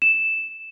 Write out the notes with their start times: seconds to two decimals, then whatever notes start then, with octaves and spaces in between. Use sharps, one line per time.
0.02 E7